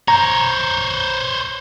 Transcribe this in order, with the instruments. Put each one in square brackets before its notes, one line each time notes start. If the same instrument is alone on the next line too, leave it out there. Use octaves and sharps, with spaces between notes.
[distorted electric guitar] C5 C#5 [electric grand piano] A#5